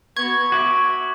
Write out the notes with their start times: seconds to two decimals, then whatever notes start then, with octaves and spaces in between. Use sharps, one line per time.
0.17 B3 F#4 C#6 G#6
0.52 F#4 E5 D6